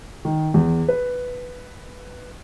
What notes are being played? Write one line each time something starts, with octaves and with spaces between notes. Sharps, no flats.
D#3
E2
B4